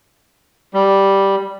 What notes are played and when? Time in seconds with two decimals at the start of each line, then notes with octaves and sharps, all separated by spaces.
0.74 G3